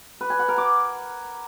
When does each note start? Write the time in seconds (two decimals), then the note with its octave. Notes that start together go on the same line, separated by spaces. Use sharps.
0.21 B4
0.30 G#5
0.39 F#5
0.49 A#4
0.58 D6